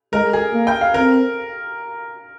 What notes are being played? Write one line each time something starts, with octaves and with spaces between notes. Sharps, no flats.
G#3 A#4
G#4
A#3
G5
F5
C4 A#4